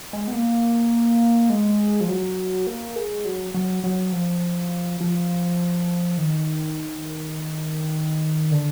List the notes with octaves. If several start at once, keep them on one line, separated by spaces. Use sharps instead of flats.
G#3
B3
A#3
G#3
F3
F#3
A#3
G#3
F#3
F#3
F#3
F3
F3
D#3
D3